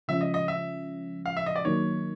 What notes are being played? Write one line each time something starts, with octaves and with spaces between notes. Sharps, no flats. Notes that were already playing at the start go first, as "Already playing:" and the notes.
C#3 F3 G#3 C#4 E5
D#5
D#5
E5
F5
E5
D#5
D5
D#3 F#3 A#3 D#4 C#5